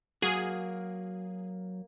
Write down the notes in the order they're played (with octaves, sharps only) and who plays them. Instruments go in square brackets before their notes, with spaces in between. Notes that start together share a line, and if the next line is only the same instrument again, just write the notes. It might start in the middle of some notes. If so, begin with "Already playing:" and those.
[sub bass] F#3 [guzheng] A#3 A#4 [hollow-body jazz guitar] F#4 [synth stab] G#4